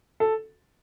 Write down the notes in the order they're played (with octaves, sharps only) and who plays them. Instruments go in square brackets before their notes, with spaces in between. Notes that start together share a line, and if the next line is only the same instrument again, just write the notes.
[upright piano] A4